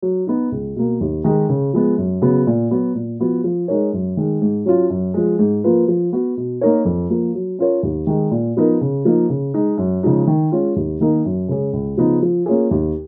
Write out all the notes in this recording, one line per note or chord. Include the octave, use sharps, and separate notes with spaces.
F#3
B3 D#4
C#2
B2 A#3
D#2
D#3 G#3 D#4
C#3
F3 G#3 B3
F#2
C#3 F#3 B3
A#2
F#3 B3 F#4
A#2
F3 B3 F#4
F3
G#3 D#4 A#4 C#5
F#2
D#3 G#3
G#2
F#3 C#4 F4
F#2
F3 G#3
G#2
F3 A#3 F4 B4
F3
B3 F#4
B2
A#3 D#4 A#4 C#5
F2
F3 A#3
F#3
C#4 F4 A#4 C#5
D#2
D#3 G#3 D#4
A#2
F3 B3 D#4 A#4
C#3
F3 A#3 D#4
C#3
G#3 D#4
F#2
C#3 F3 G#3 D#4
D#3
G#3 C#4 F4
D#2
D#3 A#3 D#4 A#4
F#2
C#3 G#3 C#4 G#4
C#2
C#3 F3 B3 D#4
F3
A#3 C#4 F4 G#4
D#2